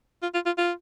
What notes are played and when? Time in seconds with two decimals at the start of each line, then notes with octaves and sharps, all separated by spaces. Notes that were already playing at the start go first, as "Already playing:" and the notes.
0.22 F4
0.34 F4
0.46 F4
0.58 F4